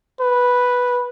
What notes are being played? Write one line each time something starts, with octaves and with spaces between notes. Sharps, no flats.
B4